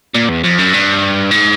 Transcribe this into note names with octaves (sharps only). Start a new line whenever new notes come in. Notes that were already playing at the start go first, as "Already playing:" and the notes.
A#2
E2
F2
F#2
G2
G#2